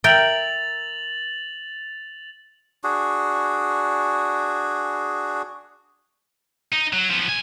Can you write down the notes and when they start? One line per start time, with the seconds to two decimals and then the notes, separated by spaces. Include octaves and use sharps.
0.04 A#4 E5 G5 A6 F7 F#7
2.84 D4 F#4 G#4
6.72 D#4
6.93 F#3
7.11 F3 B3
7.28 B1 G#5